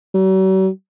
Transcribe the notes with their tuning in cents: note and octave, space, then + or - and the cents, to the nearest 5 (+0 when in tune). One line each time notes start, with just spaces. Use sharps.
F#3 +45